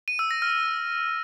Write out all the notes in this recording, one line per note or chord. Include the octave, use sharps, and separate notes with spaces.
D#7
E6
A#6
F6